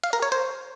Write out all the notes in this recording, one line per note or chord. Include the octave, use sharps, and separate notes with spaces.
F5
A#4
C#5
C5